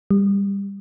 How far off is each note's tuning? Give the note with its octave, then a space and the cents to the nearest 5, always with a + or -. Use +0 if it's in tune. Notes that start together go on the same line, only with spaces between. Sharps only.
G3 +20